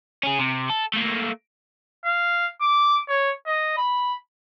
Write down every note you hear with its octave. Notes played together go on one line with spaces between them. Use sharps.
C#4 G#4
C3
A4
A3 A#3
F5
D6
C#5
D#5
B5